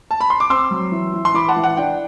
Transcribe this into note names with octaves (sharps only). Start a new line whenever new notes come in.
A5
B5
C6
D6
C4 C6 E6
F#3
E3
E3
C6
E3 B5 D6
F#5 A5
E3
F#5
D4 G5